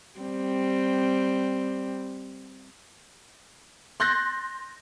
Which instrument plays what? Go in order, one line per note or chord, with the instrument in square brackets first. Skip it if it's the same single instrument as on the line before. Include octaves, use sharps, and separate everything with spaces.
[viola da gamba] G3 C4
[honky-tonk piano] C6 F#6 G6 A6 A#6